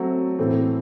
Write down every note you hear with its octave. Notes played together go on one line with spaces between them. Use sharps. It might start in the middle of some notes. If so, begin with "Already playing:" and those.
Already playing: F#3 A3 C4 F#4 A4
A2 E3 A3 C4